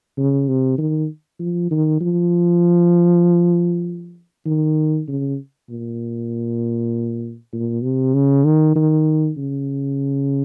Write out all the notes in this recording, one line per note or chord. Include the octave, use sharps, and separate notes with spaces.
C#3
C3
D#3
F3
D#3
F3
D#3
C#3
A#2
A#2
C3
C#3
D#3
D#3
C#3